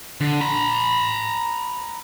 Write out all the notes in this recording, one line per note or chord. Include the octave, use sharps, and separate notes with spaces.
D3
A#5 B5